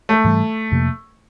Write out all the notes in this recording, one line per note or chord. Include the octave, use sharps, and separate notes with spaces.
A3
G#2 E3 G3
F2 C3 F3 A#3